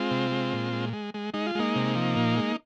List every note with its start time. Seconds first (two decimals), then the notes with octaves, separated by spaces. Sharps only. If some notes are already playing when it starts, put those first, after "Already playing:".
Already playing: G#3 C4 F4
0.11 C3
0.31 G#3
0.53 A#2
0.73 G#3
0.93 G#3
1.14 G#3
1.34 G#3 D#4
1.46 F4
1.55 G#3 A#3 D#4
1.76 C3
1.96 F3
2.16 A#2
2.37 G#3